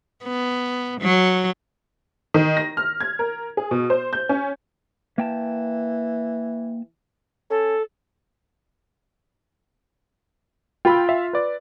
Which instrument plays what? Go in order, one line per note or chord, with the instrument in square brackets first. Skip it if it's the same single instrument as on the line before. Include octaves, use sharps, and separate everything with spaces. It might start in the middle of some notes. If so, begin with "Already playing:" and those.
[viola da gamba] B3
F#3
[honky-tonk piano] D#3
A#6
F6
G#6
A#4
G#4
B2
C5
G6
C#4
[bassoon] E3 [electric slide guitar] A#3 G5 A5
[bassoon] C#4 [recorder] A4
[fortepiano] F4 [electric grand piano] G5 B5 E6
[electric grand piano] E5 F5
B4 D5